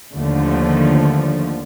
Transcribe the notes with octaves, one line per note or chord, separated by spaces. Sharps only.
D#2 D3 F3 A3